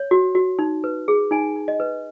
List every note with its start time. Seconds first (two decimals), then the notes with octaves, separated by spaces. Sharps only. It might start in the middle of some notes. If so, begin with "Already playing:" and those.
Already playing: C#5
0.11 F#4
0.35 F#4
0.59 D#4
0.84 B4
1.08 G#4
1.31 D#4 G#5
1.56 D#4
1.68 D#5
1.80 B4